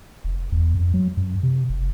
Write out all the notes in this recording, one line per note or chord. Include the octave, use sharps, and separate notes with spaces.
F1
E2
F2
F#3
F#2
C3
F#1